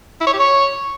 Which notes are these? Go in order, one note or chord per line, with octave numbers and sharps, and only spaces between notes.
E4
C#5
G4
C#5